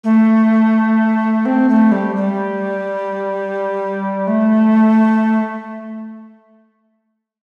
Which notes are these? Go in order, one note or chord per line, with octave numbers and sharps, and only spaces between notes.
A3
C4
A3
G3
G3
A3